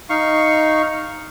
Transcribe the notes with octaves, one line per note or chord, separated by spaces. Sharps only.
D#4 F5 C#6